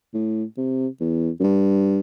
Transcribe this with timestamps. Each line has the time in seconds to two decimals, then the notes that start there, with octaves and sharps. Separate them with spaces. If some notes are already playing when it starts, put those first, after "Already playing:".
0.14 A2
0.57 C3
1.00 E2
1.40 F#2
1.44 G2